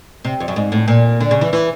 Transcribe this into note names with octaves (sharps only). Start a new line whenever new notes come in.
C3
F2
F#2
G#2
A2
A#2
D3
C#3
E3
E3